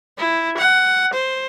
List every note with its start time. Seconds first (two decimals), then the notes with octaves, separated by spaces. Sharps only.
0.18 E4
0.58 F#5
1.14 C5